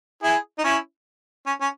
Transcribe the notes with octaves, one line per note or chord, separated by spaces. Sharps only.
E4 G#4
D#4
C#4 E4
C#4
C#4